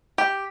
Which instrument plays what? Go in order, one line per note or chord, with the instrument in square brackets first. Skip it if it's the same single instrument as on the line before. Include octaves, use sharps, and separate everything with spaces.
[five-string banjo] G4